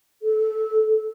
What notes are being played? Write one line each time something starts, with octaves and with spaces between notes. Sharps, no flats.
A4